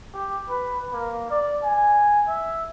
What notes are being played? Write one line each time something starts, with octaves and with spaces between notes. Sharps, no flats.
G4
B4
A#3
D5
G#5
E5